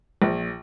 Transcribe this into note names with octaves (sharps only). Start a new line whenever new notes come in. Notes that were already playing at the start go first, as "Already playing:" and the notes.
A#1